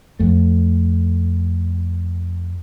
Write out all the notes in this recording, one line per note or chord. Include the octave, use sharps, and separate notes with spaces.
F2 A3